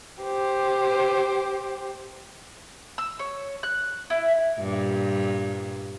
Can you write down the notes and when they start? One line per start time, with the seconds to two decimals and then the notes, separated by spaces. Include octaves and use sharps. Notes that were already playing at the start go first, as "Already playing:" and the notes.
0.23 G4 C5
2.98 E6
3.19 C#5
3.63 F#6
4.10 E4
4.60 G2 A#2